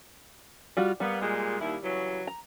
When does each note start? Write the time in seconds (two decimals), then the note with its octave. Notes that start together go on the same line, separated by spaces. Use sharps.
0.77 G3 F4 F#4
1.00 G3 A#3 B3
1.21 A#2 G#3
1.61 D#2 E4
1.83 C#3 E3 F#3
2.27 A#5